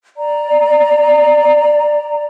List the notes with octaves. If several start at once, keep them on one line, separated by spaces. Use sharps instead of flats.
D5 A#5